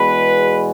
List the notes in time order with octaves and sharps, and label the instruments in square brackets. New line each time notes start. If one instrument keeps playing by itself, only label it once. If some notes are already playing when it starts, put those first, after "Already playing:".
Already playing: [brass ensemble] E2 B2 G#3 B4